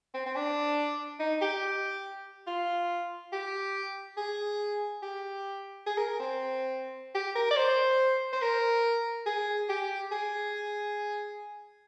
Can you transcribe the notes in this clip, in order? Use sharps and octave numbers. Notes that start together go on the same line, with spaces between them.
C4
C4
D4
D#4
G4
F4
G4
G#4
G4
G#4
A#4
A#4
C4
G4
A#4
D5
C5
C5
A#4
G#4
G4
G#4